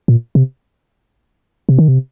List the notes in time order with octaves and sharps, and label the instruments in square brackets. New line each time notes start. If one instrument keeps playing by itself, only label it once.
[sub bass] A#2
C3
C3
D#3
C3